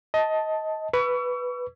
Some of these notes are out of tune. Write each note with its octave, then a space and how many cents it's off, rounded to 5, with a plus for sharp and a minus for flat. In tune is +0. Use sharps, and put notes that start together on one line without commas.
D#5 +20 A5 +0
B4 +0 C#6 +35 E6 +35